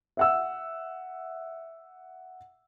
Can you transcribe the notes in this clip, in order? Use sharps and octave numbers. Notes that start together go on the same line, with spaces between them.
E5 F#5 E6